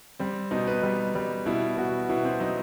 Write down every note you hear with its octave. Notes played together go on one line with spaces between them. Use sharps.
G3 C4
B2 D#4
B4
G3
G3
B2 E4
B2 F#4
B2 E4
C4
F#3 D#4